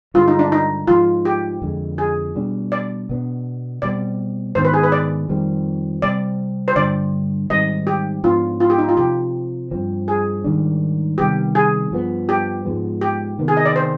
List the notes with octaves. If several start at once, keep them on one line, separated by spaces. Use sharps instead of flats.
G2 D3 G#3 F4
D#4
D4
D#4
G#2 F3 G#3 F4
G4
F2 D3 G#3
G#4
B2 G3 D4
D5
B2 B3 D4
B2 G3 C4 D5
G#2 D#3 B3 D4 C5
B4
G#4
B4
D5
F2 D#3 G3 C4
C3 G3 C4 D5
C5
G2 D3 G3 D5
G#2 D#3 G3 C4 D#5
G4
G#2 F3 B3 D4 F4
F4
G4
D#4
F4
C3 F3 C4 G4
G2 F3 C4
G#4
G#2 D#3 G3 D4
C3 D#3 G3 B3 G4
G#4
G2 F3 B3
G4
G#2 F3 G#3 B3
G4
C3 D#3 B3
G#4
D#5
D5
C5